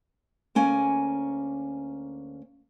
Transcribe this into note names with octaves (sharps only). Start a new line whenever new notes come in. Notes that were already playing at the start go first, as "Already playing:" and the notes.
D2 A#3 C#4 G#5